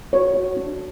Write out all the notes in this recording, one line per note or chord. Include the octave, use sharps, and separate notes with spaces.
F#4 C#5
F#4
D4